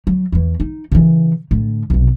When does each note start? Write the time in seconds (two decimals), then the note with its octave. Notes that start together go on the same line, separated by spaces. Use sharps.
0.07 F#3
0.32 E2 E3
0.60 D#4
0.92 C#3 E3
1.51 A2 D3
1.90 B1 C3